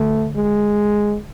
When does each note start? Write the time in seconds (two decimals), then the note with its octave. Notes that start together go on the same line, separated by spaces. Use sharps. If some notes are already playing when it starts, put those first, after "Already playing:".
Already playing: D3 A3
0.36 G#3